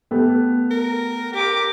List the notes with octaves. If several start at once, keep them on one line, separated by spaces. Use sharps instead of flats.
A3 B3 G4
A#4
G4 A#4 D6